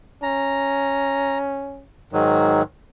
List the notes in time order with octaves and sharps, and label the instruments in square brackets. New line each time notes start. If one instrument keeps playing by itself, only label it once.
[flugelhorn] C#4 [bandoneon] A#5
[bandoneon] G#2 D#3 F#3